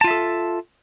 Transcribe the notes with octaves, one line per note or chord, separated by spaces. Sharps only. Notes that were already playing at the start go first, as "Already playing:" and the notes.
F4 A4 E5 A5